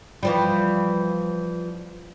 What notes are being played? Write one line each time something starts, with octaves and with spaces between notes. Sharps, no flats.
E3 F3 G3